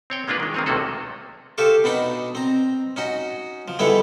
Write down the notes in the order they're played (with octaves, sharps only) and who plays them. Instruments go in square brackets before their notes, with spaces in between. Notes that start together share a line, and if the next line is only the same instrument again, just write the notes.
[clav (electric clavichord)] C4 C#5 G5
G#3 A#3 D4 F4 B4
D#3 G#3
D#3 A#3 C4 G#4 C#5
B1 C3 A3 A#3 F#4 A4
[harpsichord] G4 A4 C5 F5 C#6
B2 D4 D#4 B5
C4 A#5
C#4 D#4 F#4
F3
D3 G3 G#3 B3 E4 C#5